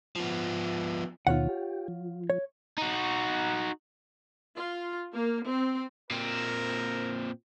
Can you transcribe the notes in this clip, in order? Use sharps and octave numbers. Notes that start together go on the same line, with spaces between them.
F3 B3
D#2 B2 D#3 F4 C#5 F#5
G4
F3
C#5
D#4 F#4
F4
A#3
C4
A#2 C4 A#4